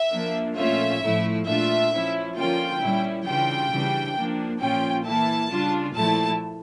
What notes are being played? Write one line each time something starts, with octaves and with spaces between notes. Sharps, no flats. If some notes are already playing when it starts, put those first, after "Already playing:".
Already playing: E5
F3 A#3 D4
A#2 F3 A3 C#4 F4 E5
A2 F3 A3 E4
A#2 A3 D4 F4 E5
F3 C#4 E4
D3 F3 A#3 C#4 F4 G5
A#2 G3 C#4 E4
C#3 E3 G3 D4 F4 G5
C#3 E3 G3 D4
F3 A#3 D4
A#2 F3 C#4 F4 G5
E3 A#3 E4 A5
C#3 G3 D4 F4
A#2 F3 A3 E4 A5